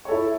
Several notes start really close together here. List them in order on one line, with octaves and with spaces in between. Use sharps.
C#5 A4 E4